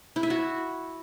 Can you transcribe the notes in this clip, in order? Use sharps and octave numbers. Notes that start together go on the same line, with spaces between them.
E4
E5
F#4